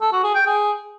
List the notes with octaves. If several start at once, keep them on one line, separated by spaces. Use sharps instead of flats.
A4
F#4
G#4
G5
G#4